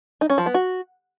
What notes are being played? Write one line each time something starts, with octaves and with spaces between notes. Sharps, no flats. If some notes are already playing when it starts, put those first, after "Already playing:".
D#4
C#4
F3
B3
F#4